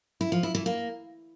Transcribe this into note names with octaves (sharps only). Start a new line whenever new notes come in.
E4
F3
E4
E3
A#3